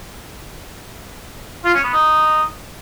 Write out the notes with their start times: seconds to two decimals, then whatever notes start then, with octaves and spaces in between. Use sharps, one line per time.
1.65 F4
1.74 C#4
1.84 B3
1.93 D#4